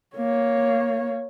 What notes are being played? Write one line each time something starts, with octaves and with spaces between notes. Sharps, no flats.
A#3 C#5